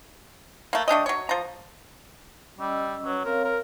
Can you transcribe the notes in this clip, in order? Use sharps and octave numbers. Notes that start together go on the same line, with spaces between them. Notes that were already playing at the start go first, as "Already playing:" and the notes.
A3 A#3
A3 D4 G4 D#5
F#3 C#5
F3 A#5
G3 C#4 D#5 E6
F#3 C#4 B4 C#5
C4 A#4 C#5 F5
A#4